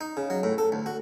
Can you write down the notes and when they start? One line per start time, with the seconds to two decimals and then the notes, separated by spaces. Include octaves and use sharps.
0.01 D#4
0.17 C#3
0.30 F#3
0.43 A2
0.58 A4
0.72 D2
0.86 F#4